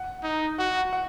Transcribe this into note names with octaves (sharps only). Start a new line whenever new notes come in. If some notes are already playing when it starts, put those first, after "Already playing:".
Already playing: F#5
D#4
F#4 F#5
F#5